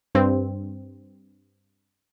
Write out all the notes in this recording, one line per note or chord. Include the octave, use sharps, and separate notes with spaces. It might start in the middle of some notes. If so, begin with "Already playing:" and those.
G2 C4